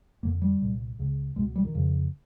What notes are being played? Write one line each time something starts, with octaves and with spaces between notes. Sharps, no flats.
F2 D3 A#3
G3
C2 A#2
C#2 C#3
C#2 B2 G#3
G3
D#3
F2 C#3